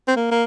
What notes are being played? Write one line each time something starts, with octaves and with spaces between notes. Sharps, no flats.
C4
A#3
A#3